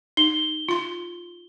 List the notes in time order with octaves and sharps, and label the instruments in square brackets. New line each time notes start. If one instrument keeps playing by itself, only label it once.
[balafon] D#4 [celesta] G7
[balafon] F4 C6